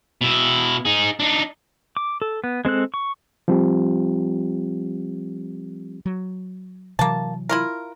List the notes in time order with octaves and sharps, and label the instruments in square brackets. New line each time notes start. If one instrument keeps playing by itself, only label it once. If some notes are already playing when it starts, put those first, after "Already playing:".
[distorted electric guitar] B2 E4
D#4 G#4
D4 D#4
[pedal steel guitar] D6
A4
B3
G#3 C4 A4 F#6
C#6
[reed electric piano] F3 G3 C4 F4 G4
[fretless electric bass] F#3
[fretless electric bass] C3 E3 F#3 [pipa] A#3 A5
[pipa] E4 F4 A#4